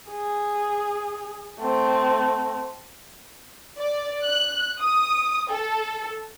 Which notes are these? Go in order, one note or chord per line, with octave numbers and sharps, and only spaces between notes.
G#4
A3 C4
D5
F#6
D#6
A4